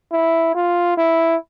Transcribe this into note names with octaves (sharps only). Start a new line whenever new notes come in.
E4
F4
E4